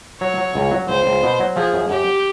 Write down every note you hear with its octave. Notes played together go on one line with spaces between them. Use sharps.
F#3 C#5
F#3
C#2
F#3
C#2 C5
C#2
B2
F#3
F3 G#4
F#2
F#2 G4